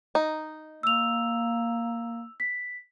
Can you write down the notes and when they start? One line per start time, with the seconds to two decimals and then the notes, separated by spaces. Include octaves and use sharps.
0.15 D#4
0.83 A#3 E6 F7
2.40 B6